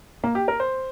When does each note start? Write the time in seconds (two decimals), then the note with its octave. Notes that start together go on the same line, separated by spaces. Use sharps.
0.24 A#3
0.35 G4
0.48 A#4
0.60 C5